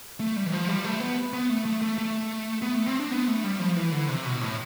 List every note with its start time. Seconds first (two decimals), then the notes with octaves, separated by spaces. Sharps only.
0.20 A3
0.36 G3
0.46 E3
0.52 F3
0.68 G3
0.84 A3
1.00 B3
1.33 B3
1.50 A3
1.65 A3
1.82 A3
1.98 A3
2.62 B3
2.74 A3
2.87 C4
3.00 D4
3.11 B3
3.28 A3
3.44 G3
3.59 F3
3.77 E3
3.92 D3
4.08 C3
4.25 B2
4.41 A2